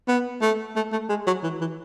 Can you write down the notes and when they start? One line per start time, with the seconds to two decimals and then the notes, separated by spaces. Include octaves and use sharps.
0.08 B3
0.42 A3
0.76 A3
0.92 A3
1.09 G#3
1.27 F#3
1.43 E3
1.61 E3